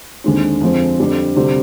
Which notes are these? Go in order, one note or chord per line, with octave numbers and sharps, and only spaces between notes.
D#2 D3 G#3 C4
F2 D3 F3 G#3 C4
F2 D3 G3 C4
D2 C3 G3 C4